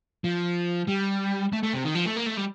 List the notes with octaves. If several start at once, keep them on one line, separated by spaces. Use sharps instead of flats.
F3
G3
A3
A3
C3
D#3
F3
A3
A#3
A3
G3